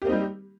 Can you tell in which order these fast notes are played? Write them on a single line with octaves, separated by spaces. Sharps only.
G4 A#3 C4 D#4 G3